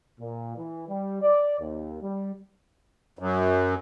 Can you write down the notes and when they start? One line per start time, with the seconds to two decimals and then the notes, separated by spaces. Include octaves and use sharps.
0.20 A#2
0.57 E3
0.88 G3
1.22 D5
1.60 D#2
2.02 G3
3.19 F#2